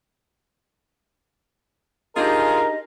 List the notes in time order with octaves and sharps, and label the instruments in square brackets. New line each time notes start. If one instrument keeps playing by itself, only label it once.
[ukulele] D4 D#4 G4 [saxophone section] F4 G#4 [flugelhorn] A#4 [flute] D#5